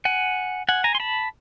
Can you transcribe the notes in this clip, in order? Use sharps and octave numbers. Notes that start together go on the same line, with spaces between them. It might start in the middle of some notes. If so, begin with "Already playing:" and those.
F#5 G#5
F#5 G#5
G#5 A#5
C6
A5 B5